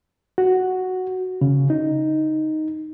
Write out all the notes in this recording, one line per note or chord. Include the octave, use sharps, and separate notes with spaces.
F#4
C#3
D#4